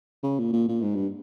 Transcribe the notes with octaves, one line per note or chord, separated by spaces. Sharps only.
C#3
A#2
A#2
A#2
G#2
G2